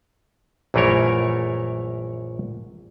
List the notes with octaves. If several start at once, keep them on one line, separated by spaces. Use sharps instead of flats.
A#1 F#2 E3 A3 A#4 C#5